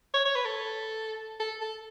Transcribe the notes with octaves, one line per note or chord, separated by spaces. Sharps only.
C#5
C#5
B4
A4
A4
A4